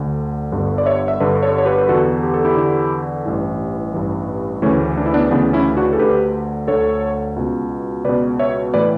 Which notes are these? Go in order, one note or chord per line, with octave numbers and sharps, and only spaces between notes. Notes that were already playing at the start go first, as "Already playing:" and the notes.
Already playing: D2 D3
G1 G2 D3
D5
C#5 E5
E5
G1 G2 D3 B4 D5
A4 C#5
C#5
G4 B4
B4
E2 D3 F#4 A4
G4
A4
E4 G4
E2 D3
A1 G2 E3
A1 G2 E3
D2 C#3 E3 A3 C#4
D4
E4
B3 D4
D2 C#3 E3 B3 D4
C#4 E4
D4 F#4
A4
D2 D3 G4 B4
D2 D3 A4 C#5
C#2 B2
C#2 B2 B4 D5
C#5 E5
A2 E3 B4 D5